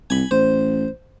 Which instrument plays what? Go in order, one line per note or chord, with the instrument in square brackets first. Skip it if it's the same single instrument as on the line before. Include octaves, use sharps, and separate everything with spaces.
[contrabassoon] C2 [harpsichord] G#5 B5
[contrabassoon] A1 [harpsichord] C5